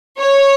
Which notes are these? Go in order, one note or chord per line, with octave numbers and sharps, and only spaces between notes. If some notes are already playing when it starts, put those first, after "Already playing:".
C#5